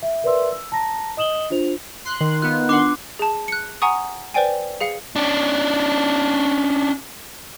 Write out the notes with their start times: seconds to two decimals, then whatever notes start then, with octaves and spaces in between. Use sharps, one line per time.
0.02 E5
0.24 A#4 B4 D5 E5 C6 E6
0.52 E6
0.72 A5 A#5 A#6
1.17 D#5 D#6 E7 F#7 G7
1.50 D4 F4 C5 F7
2.05 C6 F#6
2.21 D#3
2.42 B3 F4 F#6
2.69 D4 F#5 C6 D6 C7
3.19 G#4 A5
3.48 F#6 C#7
3.82 F#5 G#5 A#5 C#6 D#6
4.34 B4 C5 D5 G5 G#5
4.81 G#4 F5 C#7
5.16 C#4 D4